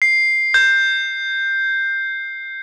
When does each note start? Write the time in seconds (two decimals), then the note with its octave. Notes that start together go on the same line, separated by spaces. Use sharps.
0.02 C7
0.54 G6